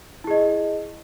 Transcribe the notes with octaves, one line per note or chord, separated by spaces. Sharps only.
E4 G#4 D#5